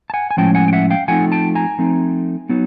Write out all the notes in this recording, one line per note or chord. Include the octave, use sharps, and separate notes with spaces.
A5
F#5 G#5
G#5
A2 F3 G#3 C#4 G5 A5
F#5 G#5
G5
E5 F#5
F5 G5
F3 A3 C4 D#4 F#5 G#5
G5 A5
G#5 A#5
F3 A3 C4 D#4
F#3 B3 D#4